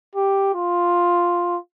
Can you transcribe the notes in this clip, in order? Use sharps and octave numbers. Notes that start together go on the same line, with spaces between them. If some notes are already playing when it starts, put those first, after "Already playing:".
G4
F4